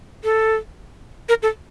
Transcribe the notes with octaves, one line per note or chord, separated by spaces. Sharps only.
A4
A#4
A4